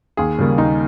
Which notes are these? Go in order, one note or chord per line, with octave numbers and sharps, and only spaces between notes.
D#2 G#4
C#3 G3 A#3
D#2 D#4